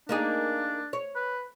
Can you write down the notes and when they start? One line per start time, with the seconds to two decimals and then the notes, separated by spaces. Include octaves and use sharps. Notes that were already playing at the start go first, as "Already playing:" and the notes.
0.09 A#3 D4 D#4 G#4
0.93 C#5
1.15 B4